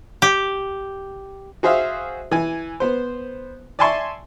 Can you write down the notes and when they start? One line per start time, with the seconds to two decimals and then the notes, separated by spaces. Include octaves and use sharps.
0.22 G4
1.63 F#4 G#4 C5 E5 F5
2.31 E3 G#5
2.80 B3 C5
3.79 D5 E5 G#5 A5 C6 C#6